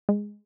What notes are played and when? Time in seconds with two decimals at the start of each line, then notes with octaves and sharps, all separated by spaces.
0.09 G#3